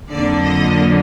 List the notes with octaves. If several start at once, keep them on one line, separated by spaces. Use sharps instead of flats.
F2 D3 F#3 A#3 D5
D#5